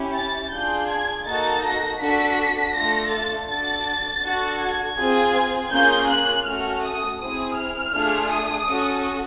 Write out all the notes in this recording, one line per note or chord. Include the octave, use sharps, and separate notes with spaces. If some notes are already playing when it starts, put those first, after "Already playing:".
Already playing: C#4 E4 G4
A6
D4 F4 G#4 G6
G#6
A#3 D#4 F#4 A4 A6
A#6
D4 F#4 A4 B6
A3 D4 F4 A4 A#6
A6
D4 F#4 A4 A6
D4 F#4 A4
G#6
C4 F4 G#4
A#3 C#4 F4 G#4 G6
F#6
A3 C#4 F#4 A4 F6
D#6
C4 E4 G#4 D#6
F6
A3 D4 F4 G#4
D#6
C#4 F#4 A4